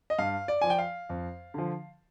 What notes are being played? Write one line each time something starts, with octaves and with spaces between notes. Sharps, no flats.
D#5
G2 F5
D5
F3 G#5
G5
F5
F2
D3 F3